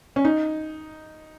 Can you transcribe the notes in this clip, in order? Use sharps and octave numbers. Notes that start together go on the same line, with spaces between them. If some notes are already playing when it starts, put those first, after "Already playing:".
C#4
D#4